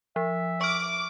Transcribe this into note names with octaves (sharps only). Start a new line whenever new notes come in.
F3 E5
C#6 D6 F6